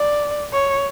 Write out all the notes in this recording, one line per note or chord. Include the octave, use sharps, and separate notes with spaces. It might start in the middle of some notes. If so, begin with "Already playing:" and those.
Already playing: D5
C#5